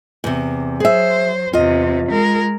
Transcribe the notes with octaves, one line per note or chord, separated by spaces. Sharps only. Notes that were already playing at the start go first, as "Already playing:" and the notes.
E2 C3
F#3 G#4 C5 E5
E2 C3 F4 D#5
G#3 A#4